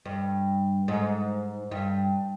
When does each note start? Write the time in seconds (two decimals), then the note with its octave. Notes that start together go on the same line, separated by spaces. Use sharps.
0.06 G2
0.88 G#2
1.71 G2